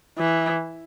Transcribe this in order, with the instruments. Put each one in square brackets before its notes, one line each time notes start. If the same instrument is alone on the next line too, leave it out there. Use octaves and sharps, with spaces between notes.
[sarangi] E3